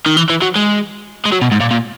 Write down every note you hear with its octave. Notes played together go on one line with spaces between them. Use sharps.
D#3
E3
E3
F#3
G#3
G#3
F#3
B2
G#2
A#2
A#2